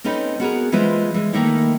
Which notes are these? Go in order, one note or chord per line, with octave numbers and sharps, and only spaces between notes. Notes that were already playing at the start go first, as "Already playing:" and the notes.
C4 C#4 D#4 A4 B4
B3 F#4 G#4 A#4
E3 G#3 E4 F4 B4 C5
E3 G#3
D#3 A3 A#3 D#4 E4